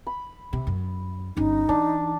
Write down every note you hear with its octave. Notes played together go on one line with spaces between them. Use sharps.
B5
C3
F#2
G1 C#4 D#4
E3 D4